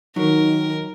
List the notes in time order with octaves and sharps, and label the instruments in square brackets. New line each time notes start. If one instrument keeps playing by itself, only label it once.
[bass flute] D#3 [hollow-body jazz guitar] F#3 [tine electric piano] D#4 [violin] A#4